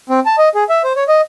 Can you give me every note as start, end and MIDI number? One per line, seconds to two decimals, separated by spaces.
0.10 0.20 60
0.26 0.36 81
0.38 0.49 75
0.55 0.64 68
0.69 0.82 76
0.84 0.93 72
0.96 1.04 73
1.08 1.21 75